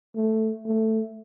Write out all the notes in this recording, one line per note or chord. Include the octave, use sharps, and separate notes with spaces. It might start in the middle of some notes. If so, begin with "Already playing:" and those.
A3
A3